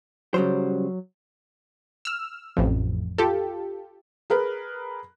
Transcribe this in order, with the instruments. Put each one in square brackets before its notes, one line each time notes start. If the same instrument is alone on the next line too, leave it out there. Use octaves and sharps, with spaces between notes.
[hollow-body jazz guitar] C#3 G3 C5 [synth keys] F#3
[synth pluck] E6 F6
A1 F2
F4 G4 A4
[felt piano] G#4 A#4 B4